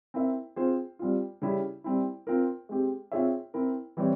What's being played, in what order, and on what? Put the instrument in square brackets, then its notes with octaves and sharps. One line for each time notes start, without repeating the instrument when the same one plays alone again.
[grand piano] C4 E4 A#4 E5
C4 F4 G#4 C5
G3 C4 F4
C#3 G3 C#4 E4 G4
G3 C4 E4
C4 F4 A#4
G#3 C4 G4
C4 F4 G#4 C#5 E5
C4 E4 A#4
E3 G3 C4 G4 C#5